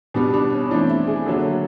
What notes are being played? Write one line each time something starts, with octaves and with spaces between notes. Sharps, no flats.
B2 G3 B3 D4
D4
C#4
E3 A3 C4 D4
E4
G#4
D3 F#3 A#3 A4